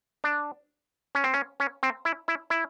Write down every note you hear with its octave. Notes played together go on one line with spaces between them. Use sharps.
D4
C#4
C4
C#4
C#4
C4
E4
E4
E4